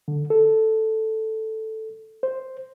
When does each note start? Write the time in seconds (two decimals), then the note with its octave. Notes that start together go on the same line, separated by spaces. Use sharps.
0.08 D3
0.30 A4
2.23 C5